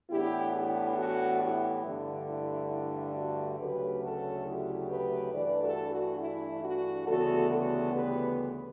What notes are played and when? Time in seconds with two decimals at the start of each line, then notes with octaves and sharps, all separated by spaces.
0.10 A2 E3 B3 D4 E4 G4
0.54 E4 G4
0.98 F#4 A4
1.41 E4 G4
1.85 G2 D3 A3
2.28 E4
2.72 E4
3.16 F#4
3.59 D2 C#3 F#3 A3 C#4 G4 B4
4.02 F#4 A4
4.46 E4 G4
4.89 G4 B4
5.32 G2 E3 A3 D4 B4 D5
5.62 F#4 A4
5.90 F#4
6.20 E4
6.63 F#4
7.07 D2 C#3 E3 G3 B3 F#4 A4
7.50 F#4 A4
7.93 G4 B4